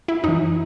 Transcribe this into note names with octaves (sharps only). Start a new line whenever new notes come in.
E4
F#2 E3 D#4